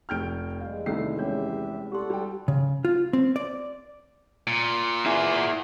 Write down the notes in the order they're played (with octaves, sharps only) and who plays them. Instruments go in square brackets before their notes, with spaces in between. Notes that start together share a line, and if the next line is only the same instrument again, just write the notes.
[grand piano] F1 F6 [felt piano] G5 G6 D7
[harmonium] E2 G3 G#3 [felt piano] F5
[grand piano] C2 A3 C7 [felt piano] D#3 [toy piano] C#4 E6
[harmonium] E2 G4 E5 [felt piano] G#3 B3 C#4 [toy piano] F#4 C#5
[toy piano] G4 C6 [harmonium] A4 D5 F#5
[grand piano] G3 G5
[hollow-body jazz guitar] C#3
F4
C4
D5
[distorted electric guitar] A#2
[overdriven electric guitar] E4 G#4